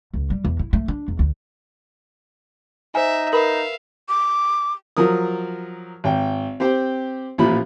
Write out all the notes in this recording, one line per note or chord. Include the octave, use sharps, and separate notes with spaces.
C#2
G3
E2
E4
A3
D4
E2
D2
D#4 C5 E5 G#5
A#4 B4 E5 F5 B5
D6
F3 F#3 A#4 D#6
G#1 G5
C4 G4 C5 G5
A1 A#2 F3 B5